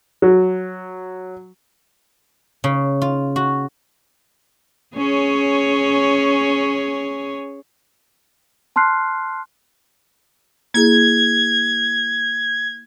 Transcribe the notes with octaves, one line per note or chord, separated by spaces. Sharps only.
F#3
C#3
F4
F#4
C#4 G#4 C#5
A5 C6 F6 F#6 C7
A#3 E4 G#4 G#6